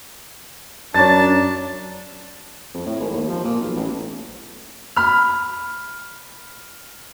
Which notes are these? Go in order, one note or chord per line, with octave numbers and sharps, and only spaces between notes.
F#2 D4 C#5 A5 A#5 A6
F2
A2
G#1
D#2
F3
A#2
B1
A1
B5 F6